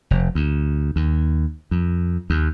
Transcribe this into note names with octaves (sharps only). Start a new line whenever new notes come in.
F1
D2
D#2
F2
D#2